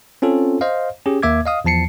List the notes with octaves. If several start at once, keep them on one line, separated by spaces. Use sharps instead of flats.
C4 C#4 F4 A4
C5 D#5 F5
C#4 G4 G#4
D#2 A#3 E5 D6 G#6
D#5 F5 D#6
E2 F3 A5 C7 C#7